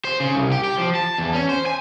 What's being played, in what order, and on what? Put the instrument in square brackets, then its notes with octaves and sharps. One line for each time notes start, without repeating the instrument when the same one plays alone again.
[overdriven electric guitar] C5
C#3
C2
G4
G4
F3
A5
E2
C#4
C5
G#5